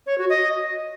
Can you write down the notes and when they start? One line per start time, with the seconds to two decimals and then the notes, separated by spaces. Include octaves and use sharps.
0.07 C#5
0.18 F#4
0.30 D#5